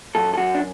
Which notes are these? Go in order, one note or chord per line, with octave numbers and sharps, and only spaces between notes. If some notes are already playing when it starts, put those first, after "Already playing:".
F#2 A4
A4
F#2 F#4
D4